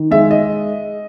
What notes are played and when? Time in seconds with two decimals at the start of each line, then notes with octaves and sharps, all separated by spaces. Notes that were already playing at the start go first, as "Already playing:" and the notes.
Already playing: D#3
0.11 G#3 E5
0.31 D#5